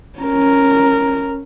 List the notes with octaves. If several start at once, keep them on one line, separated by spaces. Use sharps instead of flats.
C#4 A#4